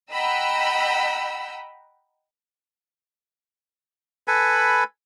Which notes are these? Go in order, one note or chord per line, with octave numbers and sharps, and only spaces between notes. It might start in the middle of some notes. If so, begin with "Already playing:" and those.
D#5 F#5 G5 A#5 B5 E6
A4 B4 G#5 B5